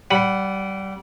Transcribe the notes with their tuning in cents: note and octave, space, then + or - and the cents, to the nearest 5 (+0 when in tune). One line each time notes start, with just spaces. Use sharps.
G3 -20 F#5 +0 B5 +0